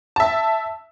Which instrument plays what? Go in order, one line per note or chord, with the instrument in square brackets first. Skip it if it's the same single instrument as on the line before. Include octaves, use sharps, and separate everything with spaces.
[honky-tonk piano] E5 A5